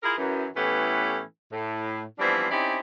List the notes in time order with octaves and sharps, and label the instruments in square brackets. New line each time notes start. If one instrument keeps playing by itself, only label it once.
[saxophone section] E4 F4 G#4 A#4
F#2 E3
A2 E3 A3 B3 C#4 G4
A2
E3 F3 G3 B3 C4 D4
C4 C#4 D#4 E4 G4 D5